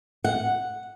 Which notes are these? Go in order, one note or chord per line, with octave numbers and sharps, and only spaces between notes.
F#5